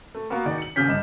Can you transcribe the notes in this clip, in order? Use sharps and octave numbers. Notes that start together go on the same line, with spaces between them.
A3
A#3 B3 F#4 A#4 F5
D#3 D#4 F#4 G#4 D5
C#7 F#7
D#1 C#3 F6 G6 B6
G1 G2 D#5 E7